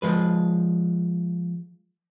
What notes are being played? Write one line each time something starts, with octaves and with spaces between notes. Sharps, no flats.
F3 G#3 B4